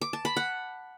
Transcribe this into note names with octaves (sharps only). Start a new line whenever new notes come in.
D6
A5
B5
F#5